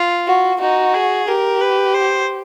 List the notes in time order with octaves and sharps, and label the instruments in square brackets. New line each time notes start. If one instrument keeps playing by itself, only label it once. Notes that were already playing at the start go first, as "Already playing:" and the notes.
Already playing: [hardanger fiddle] F4
[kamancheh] F#4
[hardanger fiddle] D#4 [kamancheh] F#4
[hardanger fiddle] G#4
[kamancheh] G4 [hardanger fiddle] A#4
[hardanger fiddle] B4
C5